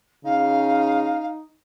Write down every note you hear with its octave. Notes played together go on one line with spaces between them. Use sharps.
C#3 D#4 F5